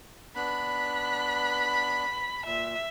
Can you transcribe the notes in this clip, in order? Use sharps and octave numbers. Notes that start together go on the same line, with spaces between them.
B3 D4 B5 F#6
A#2 E5